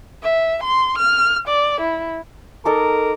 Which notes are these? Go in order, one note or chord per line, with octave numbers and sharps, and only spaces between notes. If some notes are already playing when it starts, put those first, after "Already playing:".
E5
C6
F6
D5
E4
D#4 A4 A#4 D6